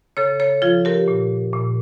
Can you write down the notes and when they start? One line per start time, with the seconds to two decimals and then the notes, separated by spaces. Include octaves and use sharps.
0.17 C#3 A4 C#5
0.40 A4 C#5
0.62 F3 F4 A4
0.85 G4 A#4
1.08 A#2
1.53 A#2